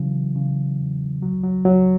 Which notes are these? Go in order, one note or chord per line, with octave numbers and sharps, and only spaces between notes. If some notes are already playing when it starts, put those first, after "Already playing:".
Already playing: C#3 E3 F#3
C#3
E2
C#2 F#3
F#3
C#2 F#3